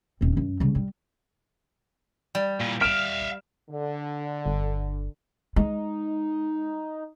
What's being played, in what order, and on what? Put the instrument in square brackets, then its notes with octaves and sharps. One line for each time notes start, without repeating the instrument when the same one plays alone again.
[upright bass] D#1 C4
F#2
C#3 G3
G3
[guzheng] G3
[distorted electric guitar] A#2 E3
[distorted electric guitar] E5 F5 [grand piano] F6 D7 E7
[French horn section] D3
[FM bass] G1
[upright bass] G#3 [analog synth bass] D#4